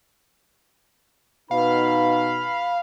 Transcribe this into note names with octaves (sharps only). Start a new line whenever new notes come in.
B2 D#4 B4 F5 B5